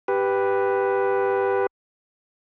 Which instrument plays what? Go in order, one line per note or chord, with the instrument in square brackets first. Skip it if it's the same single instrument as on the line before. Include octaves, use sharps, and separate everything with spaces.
[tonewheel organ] G4 B4